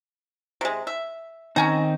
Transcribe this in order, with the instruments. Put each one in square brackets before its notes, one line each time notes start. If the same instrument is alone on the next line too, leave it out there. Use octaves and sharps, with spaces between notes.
[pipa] C3 G#3
E5
[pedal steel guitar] D#3 C4 D#4 [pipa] C#4 G#5 A#5